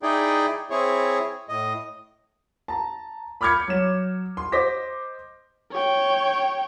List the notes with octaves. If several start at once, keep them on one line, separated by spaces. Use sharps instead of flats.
D#4 E4 G#4 D5 G5
C4 E4 G#4 C#5
A2 D#5
A5 A#5
B5 D6 F6 G6 G#6 C#7
F#3 E7
C6
C5 D#5 D6 A#6 B6
C#5 G5